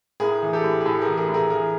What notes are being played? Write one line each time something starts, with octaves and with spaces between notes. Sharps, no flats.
A2 G#4 A#4
E3
G4 A4
A2
G#4
A2 G4 A4
G#4 A#4
E3
G#4 A#4
A2
G#4 A#4
E3 G#4 A#4